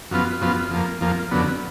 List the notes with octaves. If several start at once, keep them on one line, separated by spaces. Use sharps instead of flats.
F#2 F3 B3 F4
F#2 F3 B3 F4
F2 F3 A#3
F2 F3 A#3
F2 D3 F#3 B3